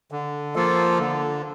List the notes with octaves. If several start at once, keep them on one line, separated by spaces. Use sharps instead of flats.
D3
F3 A#3 F4 A4
D3